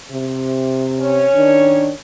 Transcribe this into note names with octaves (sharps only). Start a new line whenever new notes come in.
C3
C#4 C#5
D#3 D4